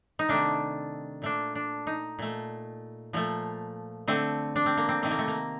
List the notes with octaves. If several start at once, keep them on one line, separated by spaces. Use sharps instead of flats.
D#4
C3 D#3 A3 D4
A#2 A3 D4
D4
D#4
A#2 A3
A#2 F3 A3
D3 A3 C4
D4
C4
A#3
C4
C3 D#3 A3 C4
A#3
A3
A#3